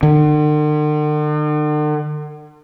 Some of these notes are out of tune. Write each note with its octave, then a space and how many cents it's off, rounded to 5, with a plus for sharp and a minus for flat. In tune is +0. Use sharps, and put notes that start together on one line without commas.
D3 +45